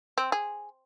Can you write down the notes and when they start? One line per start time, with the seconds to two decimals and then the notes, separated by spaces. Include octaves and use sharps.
0.18 C4
0.32 G#4